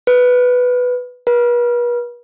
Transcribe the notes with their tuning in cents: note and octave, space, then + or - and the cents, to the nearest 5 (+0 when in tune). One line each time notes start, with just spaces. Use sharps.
B4 +5
B4 -40